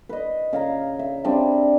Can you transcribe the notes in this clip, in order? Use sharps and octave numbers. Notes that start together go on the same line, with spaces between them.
B4 D#5
C#3 F5 A#5
E5
G3 C4 D4 G#4